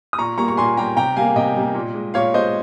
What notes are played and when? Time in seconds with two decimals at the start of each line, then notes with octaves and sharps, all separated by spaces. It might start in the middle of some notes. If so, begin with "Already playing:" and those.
0.13 D#6
0.18 A#2 A#5 C#6
0.38 G3 A#3 A#5 C#6
0.48 C#6
0.57 A#2 G#5 C6
0.77 G3 A#3 G5 A#5
0.97 C3 G5 A#5
1.17 G3 A#3 F5 G#5
1.36 C3 D#5 G5
1.56 G3 A#3
1.75 A#2
1.94 G#3
2.14 A#2 C#5 F5
2.34 G#3 C5 D#5